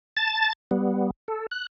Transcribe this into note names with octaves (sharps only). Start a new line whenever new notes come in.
A5 A6
G3 B3
A4
F#6